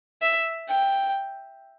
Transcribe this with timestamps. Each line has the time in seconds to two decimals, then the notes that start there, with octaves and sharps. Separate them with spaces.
0.22 E5
0.69 G5